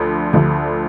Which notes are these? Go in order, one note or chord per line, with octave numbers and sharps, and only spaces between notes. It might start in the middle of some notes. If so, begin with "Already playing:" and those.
Already playing: D2 D3 F3
D2 D3 F3